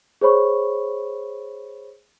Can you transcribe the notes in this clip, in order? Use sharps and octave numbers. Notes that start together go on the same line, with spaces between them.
G#4 C5 C#5 B5 C#6